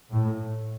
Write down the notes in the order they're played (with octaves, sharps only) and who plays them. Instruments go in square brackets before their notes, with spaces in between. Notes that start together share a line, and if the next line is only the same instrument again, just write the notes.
[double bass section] A2